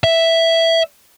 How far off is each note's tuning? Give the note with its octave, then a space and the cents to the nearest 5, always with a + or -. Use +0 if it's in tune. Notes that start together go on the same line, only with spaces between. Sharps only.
E5 +0